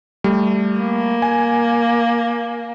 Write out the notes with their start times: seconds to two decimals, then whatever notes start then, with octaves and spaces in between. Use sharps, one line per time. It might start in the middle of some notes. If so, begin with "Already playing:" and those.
0.24 G3 A3
0.80 A#3
1.22 G#5